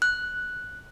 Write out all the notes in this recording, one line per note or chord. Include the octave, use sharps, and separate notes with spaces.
F#6